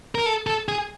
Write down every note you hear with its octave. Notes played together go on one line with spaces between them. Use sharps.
A#4
A4
A4
G#4